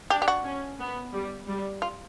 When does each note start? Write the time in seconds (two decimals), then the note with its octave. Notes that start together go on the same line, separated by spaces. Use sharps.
0.10 D4 G4
0.22 G4
0.28 F#4
0.44 C#4
0.79 B3
1.14 G3
1.48 G3
1.82 F4